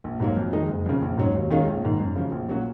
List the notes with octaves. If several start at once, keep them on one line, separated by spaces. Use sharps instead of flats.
A#1
G#2 F#3 A#3
F2
D#3 G#3 D#4
F#1
F2 C#3
A#1
G#2 F#3 C#4
D#2
D#3 G#3 C#4 F4
A#1
G#2 D#3
F#2
C#3 F3
A#1
A#2 F#3 C#4 F#4